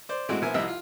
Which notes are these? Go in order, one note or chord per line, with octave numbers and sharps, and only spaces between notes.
C5 D5
A2 G#3 C4 F#4
A#1 B3 E4 A#4 C5 G#5
C2 C3 F3 D#5 E5 E6
F4